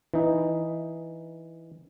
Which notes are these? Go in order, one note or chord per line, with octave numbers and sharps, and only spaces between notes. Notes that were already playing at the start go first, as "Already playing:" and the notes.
E3 D#4